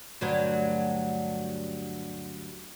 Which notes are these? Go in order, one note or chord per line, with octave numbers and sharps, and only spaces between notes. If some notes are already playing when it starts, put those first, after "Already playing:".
D2 G2 F#3